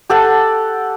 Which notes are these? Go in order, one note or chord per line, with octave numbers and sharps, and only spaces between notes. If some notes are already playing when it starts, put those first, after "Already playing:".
G4 A4 F#5 A5